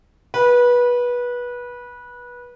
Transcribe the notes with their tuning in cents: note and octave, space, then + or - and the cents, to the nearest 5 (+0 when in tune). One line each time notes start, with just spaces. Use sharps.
B4 -20